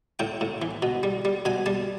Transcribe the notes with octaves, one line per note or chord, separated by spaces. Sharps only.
A2 G5
A2
E3
B2
G3
G3
B2 G#5
G3 A5